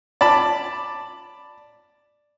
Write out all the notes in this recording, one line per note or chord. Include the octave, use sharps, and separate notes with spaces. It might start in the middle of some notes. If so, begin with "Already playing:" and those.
D5 A5 B5